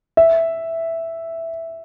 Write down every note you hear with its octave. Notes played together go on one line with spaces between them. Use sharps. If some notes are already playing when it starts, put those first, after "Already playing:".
E5